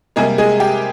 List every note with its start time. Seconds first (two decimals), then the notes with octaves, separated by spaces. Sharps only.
0.16 C3 G3 G#3 A#3 G#4
0.38 G#3 G#4
0.60 G4